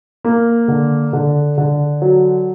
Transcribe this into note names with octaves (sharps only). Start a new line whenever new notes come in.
A#3
D3
D3
D3
F#3